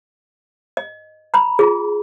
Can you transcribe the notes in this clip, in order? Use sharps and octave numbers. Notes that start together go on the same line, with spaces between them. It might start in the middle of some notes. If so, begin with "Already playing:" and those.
D#5
A#5 B5
F4 G#4